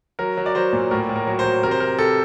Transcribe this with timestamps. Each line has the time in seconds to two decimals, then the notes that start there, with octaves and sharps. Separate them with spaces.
0.19 F#3 A#4
0.37 F#3
0.46 D5
0.55 F#3 C5
0.73 A#2
0.91 A2 A#4
1.09 A2
1.16 A#4
1.27 F#3
1.39 C5
1.45 F#3
1.63 C3 A#4
1.71 C5
1.80 C3 A#4
1.99 C3 A4